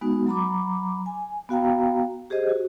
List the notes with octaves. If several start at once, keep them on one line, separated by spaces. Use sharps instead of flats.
G#3 B3 D#4 F#4
F#3 A#5 B5 D6
G#5
B3 F#4 F5 G5 A#5
G4 G#4 C5 D#5
F#4